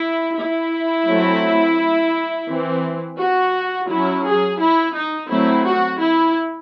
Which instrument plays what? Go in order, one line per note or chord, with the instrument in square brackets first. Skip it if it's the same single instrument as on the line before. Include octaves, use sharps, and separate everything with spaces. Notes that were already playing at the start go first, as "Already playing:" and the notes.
Already playing: [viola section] E4
E4
F#3 A3 C4
E3 C4
F#4
F#3 C#4 E4
G#4
E4
D#4
F#3 A3 C4 E4
F#4
E4